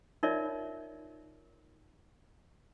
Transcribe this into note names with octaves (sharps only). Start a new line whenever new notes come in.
D#4 F4 A#4 C#5 D5 E5